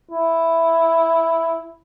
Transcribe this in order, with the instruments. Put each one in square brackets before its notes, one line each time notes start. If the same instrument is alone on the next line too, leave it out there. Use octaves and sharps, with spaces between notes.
[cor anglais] E4